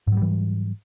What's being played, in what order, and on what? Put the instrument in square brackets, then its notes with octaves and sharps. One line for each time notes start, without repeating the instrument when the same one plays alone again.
[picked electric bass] G#2
F#3
G3
E3